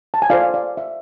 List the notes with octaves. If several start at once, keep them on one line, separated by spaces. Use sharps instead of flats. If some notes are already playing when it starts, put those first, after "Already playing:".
A5
G#5
F4 A4 C5 D5 F5
D5
E5